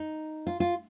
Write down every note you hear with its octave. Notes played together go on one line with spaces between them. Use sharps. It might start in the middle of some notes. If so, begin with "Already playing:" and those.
Already playing: D#4
F4
F4